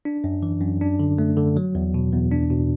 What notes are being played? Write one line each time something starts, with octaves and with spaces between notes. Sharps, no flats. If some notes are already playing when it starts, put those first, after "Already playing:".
D4
F#2
E3
F#2
D4
D3
A3
D3
F#3
E2
B2
E2
D4
B2